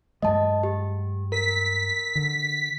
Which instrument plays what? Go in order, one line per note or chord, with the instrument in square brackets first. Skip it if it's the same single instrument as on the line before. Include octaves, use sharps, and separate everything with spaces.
[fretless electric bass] G2 F#3 G#3 [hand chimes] D#5 A5
[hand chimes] G4
[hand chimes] A#4 [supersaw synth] B6
[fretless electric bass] D3